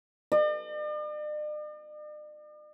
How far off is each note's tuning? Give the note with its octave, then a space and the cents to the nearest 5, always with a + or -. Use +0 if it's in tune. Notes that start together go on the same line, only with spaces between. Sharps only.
D5 +45